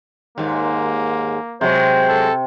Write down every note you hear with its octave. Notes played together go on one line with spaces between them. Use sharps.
D#2 G#2 A#3
C3 F#3 G#3 C5 C#6
A4